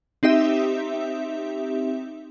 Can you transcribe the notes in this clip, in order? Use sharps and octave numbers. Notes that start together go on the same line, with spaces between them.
C4 D#4 G4 E5